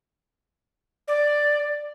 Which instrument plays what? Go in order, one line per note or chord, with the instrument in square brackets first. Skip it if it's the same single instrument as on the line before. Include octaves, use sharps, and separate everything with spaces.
[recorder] D5